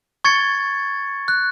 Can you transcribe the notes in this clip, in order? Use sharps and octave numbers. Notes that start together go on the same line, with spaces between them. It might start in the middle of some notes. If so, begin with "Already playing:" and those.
C#6 G#6 A6 C#7
F#6